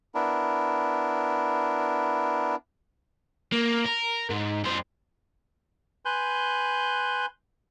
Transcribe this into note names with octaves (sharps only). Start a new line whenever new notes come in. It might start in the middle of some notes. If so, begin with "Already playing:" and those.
B3 D4 E4 A#4
A#3
A#4
G#2
F#2 C5
B4 G#5 C6 F#6 G6